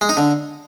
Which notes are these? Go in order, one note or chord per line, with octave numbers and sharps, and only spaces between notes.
G#3
D#4
D3